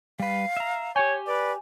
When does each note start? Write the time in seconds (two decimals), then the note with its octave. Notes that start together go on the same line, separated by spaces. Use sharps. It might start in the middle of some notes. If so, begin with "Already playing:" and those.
0.20 G3 B4 F5
0.57 E5 A#5
0.96 G4 C#5 G5 G#5
1.27 B4 D5